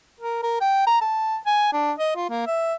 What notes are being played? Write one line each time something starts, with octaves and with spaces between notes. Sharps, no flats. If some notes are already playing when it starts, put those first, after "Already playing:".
A#4
A#4
G5
A#5
A5
G#5
D4
D#5
F4
A#3
E5